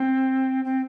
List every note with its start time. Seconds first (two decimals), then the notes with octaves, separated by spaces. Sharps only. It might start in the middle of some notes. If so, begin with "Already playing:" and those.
Already playing: C4
0.65 C4